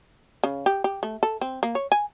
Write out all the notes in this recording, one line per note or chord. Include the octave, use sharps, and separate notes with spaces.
C#3
G4
G4
A3
A4
C4
A#3
C#5
G#5